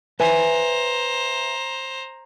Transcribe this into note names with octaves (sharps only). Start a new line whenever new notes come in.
B4 C5 E5 G#5 A#5